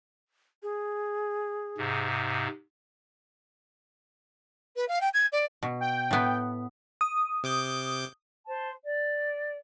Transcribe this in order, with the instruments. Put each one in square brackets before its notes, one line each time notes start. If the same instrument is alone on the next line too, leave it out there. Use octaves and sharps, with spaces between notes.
[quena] G#4
[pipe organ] G#2 C3
[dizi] B4
F5
G5
G#6
D5
[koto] B2
[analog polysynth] G5
[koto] A2 B3
[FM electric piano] D#6
[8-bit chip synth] C3 D6 G6
[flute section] C5 A5
D5